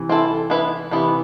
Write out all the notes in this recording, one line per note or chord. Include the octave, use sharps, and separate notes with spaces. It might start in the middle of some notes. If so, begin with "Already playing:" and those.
Already playing: C3 E3
C4 E4 A4
B3 E4 B4
C3 E3 B3 E4 B4